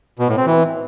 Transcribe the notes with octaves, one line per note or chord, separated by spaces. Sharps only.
B2
A2
C4
E3